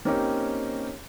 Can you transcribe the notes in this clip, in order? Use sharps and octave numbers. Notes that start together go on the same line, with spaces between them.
A#3 C4 C#4 D#4 G4 A#4